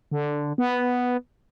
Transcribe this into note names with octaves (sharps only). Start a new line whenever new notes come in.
D3
B3